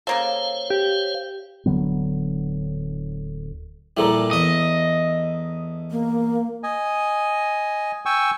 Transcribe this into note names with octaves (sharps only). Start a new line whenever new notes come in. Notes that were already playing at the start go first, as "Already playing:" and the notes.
C#3 A#3 A4 C5 C#5 F5
G4
D1 D3 F#3 B3
A#2 F3 G3 E4 A4 A#5
E2 D#5 E5
A#3
D#5 G#5
G5 G#5 C#6 E6